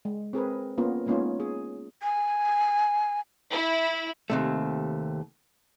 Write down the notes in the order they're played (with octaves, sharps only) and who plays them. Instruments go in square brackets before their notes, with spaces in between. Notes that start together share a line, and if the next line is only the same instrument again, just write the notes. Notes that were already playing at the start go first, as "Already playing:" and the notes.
[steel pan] G#3
C4 G#4 A#4 B4
A#3 B3 C#4 F4 A#4
G#3 A#3 B3 C#4 D#4 F4
G#4
[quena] G#5
[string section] E4
[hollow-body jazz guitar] D#2 C3 A3